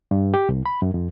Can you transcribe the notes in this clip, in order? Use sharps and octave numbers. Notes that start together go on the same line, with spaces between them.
G2
G4
C2
B5
F#2
F2